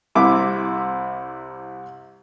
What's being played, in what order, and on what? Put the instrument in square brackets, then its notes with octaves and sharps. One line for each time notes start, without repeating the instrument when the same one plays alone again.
[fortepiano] C2 C3 E4 D6